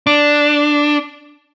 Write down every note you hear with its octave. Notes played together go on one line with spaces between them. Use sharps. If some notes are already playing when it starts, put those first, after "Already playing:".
D4